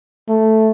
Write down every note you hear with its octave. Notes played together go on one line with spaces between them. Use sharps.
A3